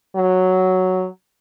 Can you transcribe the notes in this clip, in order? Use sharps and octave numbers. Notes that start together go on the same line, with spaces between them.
F#3